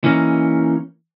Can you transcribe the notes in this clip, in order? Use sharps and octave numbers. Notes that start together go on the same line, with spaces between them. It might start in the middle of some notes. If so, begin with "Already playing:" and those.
E3 A#3 C#4 D#4